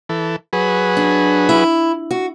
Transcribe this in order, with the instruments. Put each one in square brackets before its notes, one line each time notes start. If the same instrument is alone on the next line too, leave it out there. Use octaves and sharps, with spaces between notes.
[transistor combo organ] E3 A4
F#3 G#4 B4
[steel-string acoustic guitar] D4
E4
F#4